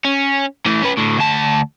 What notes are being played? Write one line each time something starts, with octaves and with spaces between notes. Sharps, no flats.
C#4
E3 A3
C#4 B4
A2 D3
D2 A5